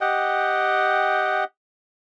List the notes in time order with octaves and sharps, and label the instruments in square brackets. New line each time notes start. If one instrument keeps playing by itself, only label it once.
[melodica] G4 D#5 F#5 G5